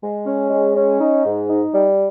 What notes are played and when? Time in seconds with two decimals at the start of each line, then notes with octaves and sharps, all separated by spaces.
0.02 G#3
0.26 C#4
0.51 G#3
0.75 C#4
1.00 D#4
1.25 G#2
1.50 D#4
1.74 G3